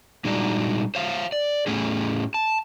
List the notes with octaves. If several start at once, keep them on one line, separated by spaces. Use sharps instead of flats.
A#2 G3 G#3 D4 D#4 F#4
C5 C#5 F5
D5
A2 A3 C#4 G#4
A5